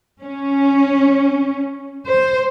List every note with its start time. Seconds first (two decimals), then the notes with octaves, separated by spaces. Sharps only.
0.20 C#4
2.06 C5